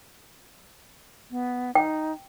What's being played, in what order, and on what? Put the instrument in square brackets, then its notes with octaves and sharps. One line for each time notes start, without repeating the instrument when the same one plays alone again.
[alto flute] B3
[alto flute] D#4 [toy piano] G5